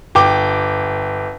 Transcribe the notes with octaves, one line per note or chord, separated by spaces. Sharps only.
G1 G5 D6